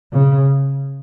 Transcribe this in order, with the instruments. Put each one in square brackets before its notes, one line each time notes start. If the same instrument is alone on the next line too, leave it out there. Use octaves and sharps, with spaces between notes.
[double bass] C#3